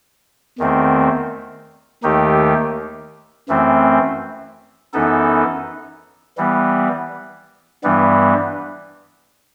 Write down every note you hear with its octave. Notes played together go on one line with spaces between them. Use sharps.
E2 D#3 A3 C4
D#2 D#3 A3 D#4 G4
F#2 E3 A3 C4
F#2 E3 B3 D#4 A4
E3 G3 B3
G2 E3 G3 B3